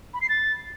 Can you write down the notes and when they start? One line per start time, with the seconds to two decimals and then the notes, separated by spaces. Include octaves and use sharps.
0.14 B5
0.21 C7
0.29 A6